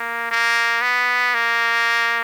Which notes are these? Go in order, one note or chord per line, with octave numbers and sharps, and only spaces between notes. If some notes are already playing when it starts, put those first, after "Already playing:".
Already playing: A#3
A#3
B3
A#3